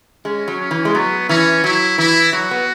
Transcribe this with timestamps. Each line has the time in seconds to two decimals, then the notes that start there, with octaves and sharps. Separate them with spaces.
0.25 G#3 C#4
0.48 F#3
0.60 C#4
0.71 E3
0.85 G#3
0.94 F#3 B3
1.29 E3 C#4
1.64 F#3 E4
1.98 E3 E4
2.33 F#3 F#4
2.51 B3